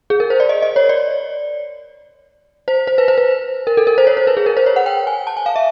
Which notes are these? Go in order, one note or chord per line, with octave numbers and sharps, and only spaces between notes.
G#4
A#4
C5
D5
D#5
D#5
C#5
D5
C5
C5
B4
C5
B4
A#4
A4
A#4
C5
C#5
C5
B4
G#4
A#4
C5
C#5
F#5
G5
G#5
A5
G#5
F5
E5